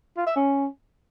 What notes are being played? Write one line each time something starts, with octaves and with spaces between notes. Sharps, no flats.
F4
E5
C#4